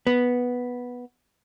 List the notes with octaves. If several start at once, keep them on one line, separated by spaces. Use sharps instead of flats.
B3